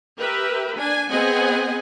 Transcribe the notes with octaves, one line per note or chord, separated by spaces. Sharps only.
G4 A#4 B4 E5
D4 G#5
B3 C4 G#4 D#5 F#5 G#5